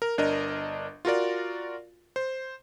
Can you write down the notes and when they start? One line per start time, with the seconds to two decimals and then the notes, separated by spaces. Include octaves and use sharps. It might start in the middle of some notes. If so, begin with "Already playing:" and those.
0.02 A#4
0.18 G1 D4 A#4 D#5
1.05 F4 F#4 A#4 D5
2.16 C5